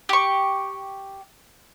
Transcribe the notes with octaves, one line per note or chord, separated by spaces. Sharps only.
G4 C#6